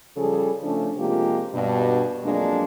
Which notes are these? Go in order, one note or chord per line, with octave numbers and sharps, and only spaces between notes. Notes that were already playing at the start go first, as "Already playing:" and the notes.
C#3 F3 G3 G#4 A4
C#3 F3 A3 C#4 D4
C3 F3 G#3 A#3 F4 G4
G2 B2
F2 F#3 G#3 A#3 D4